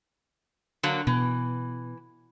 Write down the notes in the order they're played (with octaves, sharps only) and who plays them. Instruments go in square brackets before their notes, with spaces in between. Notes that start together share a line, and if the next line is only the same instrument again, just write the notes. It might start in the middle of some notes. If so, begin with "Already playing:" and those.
[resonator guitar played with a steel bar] D3 F#3 A#3
[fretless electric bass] B2 [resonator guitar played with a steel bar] E3